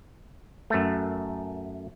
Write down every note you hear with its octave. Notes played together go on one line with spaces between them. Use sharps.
F#2 A3